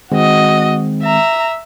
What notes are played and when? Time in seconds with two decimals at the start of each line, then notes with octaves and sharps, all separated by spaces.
0.12 D#3 G#3 C4 F#4 D#5
1.03 E5 A#5